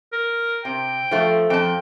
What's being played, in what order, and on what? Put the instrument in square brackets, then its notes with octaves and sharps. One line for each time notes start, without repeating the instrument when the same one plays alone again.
[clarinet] A#4
[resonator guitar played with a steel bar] C3 [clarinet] G5
[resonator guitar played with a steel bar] F3 A3
[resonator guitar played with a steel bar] F2 A5 [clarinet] G5